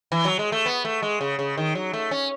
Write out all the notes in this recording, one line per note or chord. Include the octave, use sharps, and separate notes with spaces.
E3
F#3
G#3
A3
B3
A3
G#3
C#3
C#3
D#3
F#3
A3
C#4